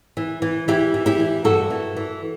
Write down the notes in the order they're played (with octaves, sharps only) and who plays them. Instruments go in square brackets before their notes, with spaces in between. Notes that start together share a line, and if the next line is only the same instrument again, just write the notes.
[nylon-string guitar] E3
E3
E3 E4 G4
E3
E4 G4
E3
G2 F#4 A4
E3
E3